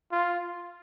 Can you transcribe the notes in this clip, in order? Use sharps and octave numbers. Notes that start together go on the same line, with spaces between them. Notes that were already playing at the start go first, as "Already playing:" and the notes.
F4